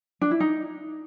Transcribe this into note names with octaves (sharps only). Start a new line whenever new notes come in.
D4
E4
D#4